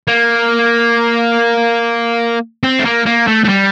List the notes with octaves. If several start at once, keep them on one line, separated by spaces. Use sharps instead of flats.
A#3
C4
A3
A#3
A#3
A3
A3
G3